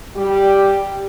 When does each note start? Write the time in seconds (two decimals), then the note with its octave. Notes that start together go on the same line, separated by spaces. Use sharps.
0.15 G3 G4